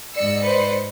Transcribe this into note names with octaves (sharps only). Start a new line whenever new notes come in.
G#2 D5 D#5 E6 C#7
B4 C5